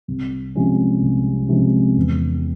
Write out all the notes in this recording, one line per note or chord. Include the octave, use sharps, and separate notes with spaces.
C2
C3 F3 G#3 C#4
C2
C3 F3 G#3 C#4
E2